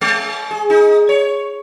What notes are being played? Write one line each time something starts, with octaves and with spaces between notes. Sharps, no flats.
G#3
G#4
D#4
C#5